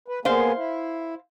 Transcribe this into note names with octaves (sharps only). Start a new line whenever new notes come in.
B4
A#3 B3 G#4 C5 F5
E4